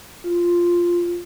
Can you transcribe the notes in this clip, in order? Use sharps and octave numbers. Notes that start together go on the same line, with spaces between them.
F4